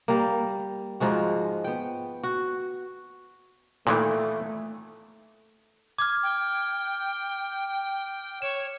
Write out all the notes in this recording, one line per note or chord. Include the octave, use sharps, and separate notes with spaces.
G3 A#3
G#2 F3 G#3 F#4
B3 G5
F#4
A#2 D#3 E3 A3
D6 F6 G#6
G5
C#5 E7